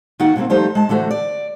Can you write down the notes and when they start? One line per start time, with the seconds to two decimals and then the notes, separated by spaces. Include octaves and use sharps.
0.20 D#3 A#3 D#4 F#4 F#5
0.36 B2 E3 G#3 A#3 C4
0.50 F3 G3 A3 D#4 G4 C5
0.75 G#3 A5
0.89 D3 E3 A3 F#4 C5
1.11 D5